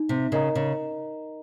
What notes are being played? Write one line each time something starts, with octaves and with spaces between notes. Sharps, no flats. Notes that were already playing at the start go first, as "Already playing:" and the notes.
Already playing: D#4
C3
C#3 A#4 D#5 A#5
C#3